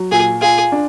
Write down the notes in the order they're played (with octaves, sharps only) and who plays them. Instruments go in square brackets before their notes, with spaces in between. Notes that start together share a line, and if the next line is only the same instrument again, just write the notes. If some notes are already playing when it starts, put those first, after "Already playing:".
Already playing: [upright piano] F#3
[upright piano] A#2 [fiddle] G#4
[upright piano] F4 [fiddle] G#4
[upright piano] D4